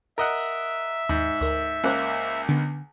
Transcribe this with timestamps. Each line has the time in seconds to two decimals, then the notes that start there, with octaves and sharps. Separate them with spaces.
0.18 A#4 D#5 E5 F#5
1.09 D#2 G#2
1.41 D2 A#4
1.84 C#2 A#3 C#4 C5 F#6
2.49 D3 B3